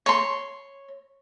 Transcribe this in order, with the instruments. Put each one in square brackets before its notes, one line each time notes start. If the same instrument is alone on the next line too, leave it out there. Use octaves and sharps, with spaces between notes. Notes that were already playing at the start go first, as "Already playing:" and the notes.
[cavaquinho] C#5 C6